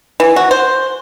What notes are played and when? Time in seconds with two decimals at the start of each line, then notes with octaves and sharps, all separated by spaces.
0.20 E3
0.36 F#4
0.51 C5